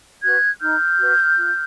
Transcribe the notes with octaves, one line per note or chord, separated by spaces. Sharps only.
F#4 B4 F#6 G#6
D#4 F6 G6
F#4 B4
F4